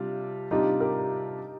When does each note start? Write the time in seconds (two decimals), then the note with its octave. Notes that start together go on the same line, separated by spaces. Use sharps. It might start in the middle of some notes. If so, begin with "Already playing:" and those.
Already playing: C3 G3 D4 F4
0.51 C3 G3 D4 D#4 F4 G4
0.80 G4 A#4